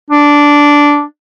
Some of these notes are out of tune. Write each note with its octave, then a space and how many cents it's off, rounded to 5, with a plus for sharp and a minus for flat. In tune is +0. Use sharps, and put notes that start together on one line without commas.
D4 -10